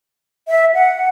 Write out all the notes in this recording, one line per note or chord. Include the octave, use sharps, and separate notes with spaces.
E5
F#5